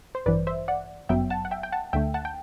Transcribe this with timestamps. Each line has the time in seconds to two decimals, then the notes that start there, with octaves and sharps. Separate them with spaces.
0.15 C5
0.26 A1 G2 E3 B4 D5
0.47 C5 E5
0.68 D5 F#5
1.09 G1 F#2 F#3 B3 E5 G5
1.30 F#5 A5
1.45 F#5
1.51 E5 G5
1.63 G5
1.72 F#5 A5
1.93 D2 D3 A3 E5 G5
2.14 F#5 A5
2.25 G5